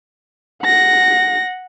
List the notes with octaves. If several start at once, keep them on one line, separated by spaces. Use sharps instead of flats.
F#5 A#6